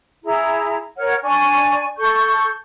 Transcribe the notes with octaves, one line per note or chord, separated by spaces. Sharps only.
E4 G#4 A#5
A#4 C#5 F#5 F6
D4 D5 G#5 C#6
A4 C#6 G6